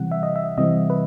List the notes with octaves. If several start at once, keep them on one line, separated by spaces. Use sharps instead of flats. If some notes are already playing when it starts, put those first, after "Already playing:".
Already playing: C3 E3 G3 C4 F#5
E5
D#5
E5
C3 E3 G3 C4 D#5
B4